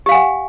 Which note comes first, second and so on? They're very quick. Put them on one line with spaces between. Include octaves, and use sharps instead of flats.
G4 F5 G#5 F#5